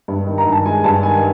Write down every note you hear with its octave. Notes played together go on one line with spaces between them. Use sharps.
G2
D#3
A#5
G2
A5
G#3 G#5
G2 A5
D#3 G#5